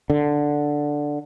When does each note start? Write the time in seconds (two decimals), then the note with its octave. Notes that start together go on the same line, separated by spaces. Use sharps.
0.10 D3